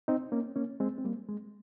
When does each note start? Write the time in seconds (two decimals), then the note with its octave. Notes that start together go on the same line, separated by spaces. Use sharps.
0.08 C4 D#4
0.32 A#3 C#4
0.56 A#3 C#4
0.80 G#3 C4
0.98 C4
1.04 G3 A#3
1.29 G#3